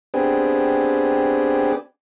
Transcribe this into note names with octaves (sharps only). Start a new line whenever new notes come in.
B3 C4 D4 G4 G#4